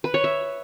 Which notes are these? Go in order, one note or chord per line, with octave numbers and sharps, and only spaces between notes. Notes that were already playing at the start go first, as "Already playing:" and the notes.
B4
C#5
E5